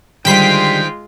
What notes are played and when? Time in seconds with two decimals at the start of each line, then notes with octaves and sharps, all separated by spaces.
0.25 D3 D#3 G3 G#3 F4 C5 G5 B6